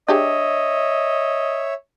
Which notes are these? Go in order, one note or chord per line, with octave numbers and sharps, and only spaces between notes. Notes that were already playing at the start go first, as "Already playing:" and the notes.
D4 G4 G#4 C#5 D#5 E5